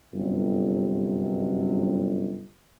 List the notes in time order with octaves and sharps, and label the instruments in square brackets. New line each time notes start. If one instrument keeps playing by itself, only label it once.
[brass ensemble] G1 F#2 C3